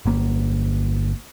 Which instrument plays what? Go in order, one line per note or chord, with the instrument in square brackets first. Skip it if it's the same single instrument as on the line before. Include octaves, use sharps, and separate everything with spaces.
[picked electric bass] G1 A#3